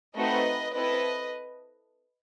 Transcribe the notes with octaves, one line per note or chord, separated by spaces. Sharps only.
A3 C4 D#4 F#4 A4 B4 D#5
C4 E4 A4 B4 D#5